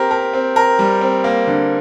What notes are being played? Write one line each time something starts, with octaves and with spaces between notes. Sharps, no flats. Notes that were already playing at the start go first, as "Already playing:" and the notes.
Already playing: C4 G4 A#4
A#4
C4
A#4
G3
C4
A#3
D3